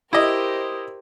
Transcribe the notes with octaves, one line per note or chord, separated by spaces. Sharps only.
E4 G4 A#4 C5 D#5